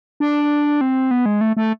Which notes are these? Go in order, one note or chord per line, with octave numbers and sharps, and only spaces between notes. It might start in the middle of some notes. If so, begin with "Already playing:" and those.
D4
C4
B3
G#3
A3
A3